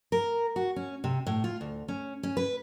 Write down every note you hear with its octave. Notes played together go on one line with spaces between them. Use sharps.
A#4
F#4
C#4
C3
A2
F4
D2
C#4
C#4
B4